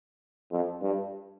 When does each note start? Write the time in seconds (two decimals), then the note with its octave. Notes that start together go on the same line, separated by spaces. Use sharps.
0.52 F2
0.82 G2